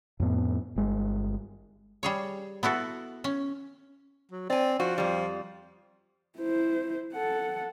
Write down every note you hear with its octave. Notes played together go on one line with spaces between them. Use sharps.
F2 A2 B3
G1 G#3
G3 G#4 C#5
B3 E4 F#4 A4
C#4
F#3
C4 D5 G#5
F3 F#4
F2 G3
E4 C5
A4 F#5